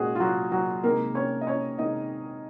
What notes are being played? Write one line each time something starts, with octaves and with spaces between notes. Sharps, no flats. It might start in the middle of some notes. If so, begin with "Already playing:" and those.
Already playing: A#2 G#3 C#4 F#4 G#4
F4
F#3 F#4
F#3 F#4
C3 D#3 G#3 A#3 A#4
C#4 C#5
D#5
C#4 C#5
C3 D#3 G#3 D#4 D#5